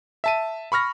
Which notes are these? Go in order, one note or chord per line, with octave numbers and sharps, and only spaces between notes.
E5 A5 D#7
B5 C#6 F6 A#6